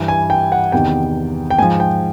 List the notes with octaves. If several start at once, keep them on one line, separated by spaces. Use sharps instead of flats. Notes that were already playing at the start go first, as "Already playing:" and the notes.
Already playing: G2 E3
G#5
G5
F#5
E2 C3 D#3 G5
G5
G#2 F3 G#5
G5